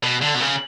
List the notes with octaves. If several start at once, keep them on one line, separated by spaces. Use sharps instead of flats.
B2
D3
B2
C#3